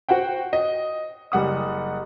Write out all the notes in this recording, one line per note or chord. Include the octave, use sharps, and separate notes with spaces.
F#4 C5 F#5 G5
D#5
F#1 G3 F#5 D#6